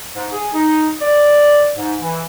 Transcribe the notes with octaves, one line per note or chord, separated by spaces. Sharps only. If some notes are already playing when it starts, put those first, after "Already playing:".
G#2
G#4
D#4
D5
G#2
E3